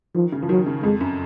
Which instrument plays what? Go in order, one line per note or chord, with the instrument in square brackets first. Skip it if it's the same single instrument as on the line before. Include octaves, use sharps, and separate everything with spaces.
[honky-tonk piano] D#3 [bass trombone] F3
[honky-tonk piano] C#3
F3
[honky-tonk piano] D#3 [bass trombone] F#3
[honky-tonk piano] C#3
[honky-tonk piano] F2 [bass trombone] G#3
[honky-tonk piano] F#2